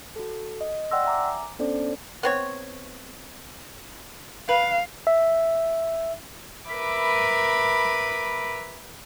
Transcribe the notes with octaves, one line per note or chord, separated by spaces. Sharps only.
F#4 A4
D#5
D5 F#5 G5 C6 E6 A#6
E5 G#5 A#5 D6
B3 C#4 D4 A4 C5 D5
B3 C4 C#5
B4 F5
E5
A#4 B4 E5 B5 D6